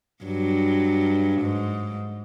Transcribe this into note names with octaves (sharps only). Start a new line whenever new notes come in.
G2 F#3
G#2